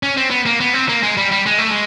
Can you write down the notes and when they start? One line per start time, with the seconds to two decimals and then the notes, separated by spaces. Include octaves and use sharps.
0.03 C#4
0.17 C4
0.31 B3
0.46 A#3
0.60 B3
0.74 C4
0.89 A#3
1.03 G#3
1.17 G3
1.32 G3
1.46 G#3
1.58 A3
1.71 G#3